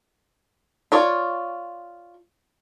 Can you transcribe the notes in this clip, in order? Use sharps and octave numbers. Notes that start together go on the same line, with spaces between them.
F4 C#5 D5